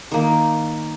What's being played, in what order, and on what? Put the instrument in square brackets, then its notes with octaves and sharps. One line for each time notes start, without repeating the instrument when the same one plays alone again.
[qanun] D#3 A#3